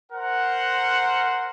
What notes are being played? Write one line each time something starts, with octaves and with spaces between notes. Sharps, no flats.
A#4 C5 F#5